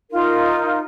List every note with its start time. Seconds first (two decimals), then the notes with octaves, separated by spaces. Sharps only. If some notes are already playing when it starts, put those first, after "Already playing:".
0.11 D#4 F4 A#4